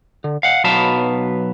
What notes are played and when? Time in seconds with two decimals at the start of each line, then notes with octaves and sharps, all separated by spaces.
0.24 D3
0.43 F5 F#5
0.64 B1 F#3 B3 B4 F5 A5